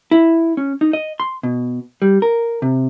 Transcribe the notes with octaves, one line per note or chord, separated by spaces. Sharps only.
E4
C#4
D#4
D#5
C6
B2
G3
A#4
C3